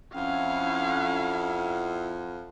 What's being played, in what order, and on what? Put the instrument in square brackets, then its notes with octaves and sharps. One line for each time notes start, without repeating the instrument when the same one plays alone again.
[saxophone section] F2 [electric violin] C#4 F5 [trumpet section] E4 F#5